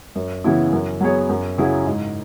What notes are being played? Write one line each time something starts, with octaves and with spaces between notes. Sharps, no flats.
F#2
C#3 E3 B3 E4
F#2
F#3 B3 G#4 C#5
F#2
C#3 F#3 E4 G#4
G#2